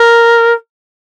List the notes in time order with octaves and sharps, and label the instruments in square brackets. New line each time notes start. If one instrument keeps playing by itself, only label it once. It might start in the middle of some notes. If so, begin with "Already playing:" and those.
Already playing: [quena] A#4